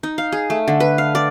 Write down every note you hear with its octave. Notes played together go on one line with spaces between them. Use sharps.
D#4
F5
G#4
A3
D3
B4
F5
D5